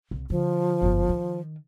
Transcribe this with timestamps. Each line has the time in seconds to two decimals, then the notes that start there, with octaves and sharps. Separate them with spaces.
0.11 C2
0.30 D3 F3
0.82 G1 F#2
1.09 D#3